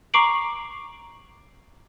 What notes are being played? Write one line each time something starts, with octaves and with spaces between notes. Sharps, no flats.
A#5 C#6 D6 C7 D7 F#7